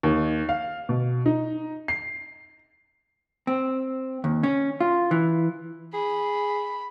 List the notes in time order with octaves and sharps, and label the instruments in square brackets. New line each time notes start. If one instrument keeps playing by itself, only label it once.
[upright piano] D#2
F5
B2
D#4
C7
[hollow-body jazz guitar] C4
D#2
C#4
F4
E3
[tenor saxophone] G#4 [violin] B5